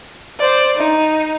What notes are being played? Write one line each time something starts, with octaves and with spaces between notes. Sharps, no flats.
C5 D5
D#4